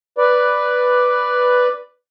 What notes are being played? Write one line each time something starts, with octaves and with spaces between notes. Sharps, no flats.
B4 D5